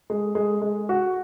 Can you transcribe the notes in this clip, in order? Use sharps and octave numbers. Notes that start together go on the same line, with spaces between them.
G#3
G#3
G#3
F#4